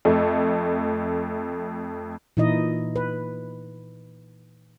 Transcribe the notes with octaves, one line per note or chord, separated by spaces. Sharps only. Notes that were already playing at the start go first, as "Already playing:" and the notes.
F2 A3
A#2 E3 D#4 E4 D#5
B4